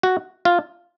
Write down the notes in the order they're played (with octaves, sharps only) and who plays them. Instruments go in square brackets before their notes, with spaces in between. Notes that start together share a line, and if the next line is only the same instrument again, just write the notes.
[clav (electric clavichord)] F#4
F4